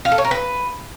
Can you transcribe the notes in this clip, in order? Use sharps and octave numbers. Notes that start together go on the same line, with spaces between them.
F5
A4
C#5
A#4
B4